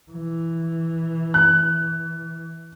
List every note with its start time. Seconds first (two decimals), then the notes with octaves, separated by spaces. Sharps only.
0.12 E3
1.34 F#6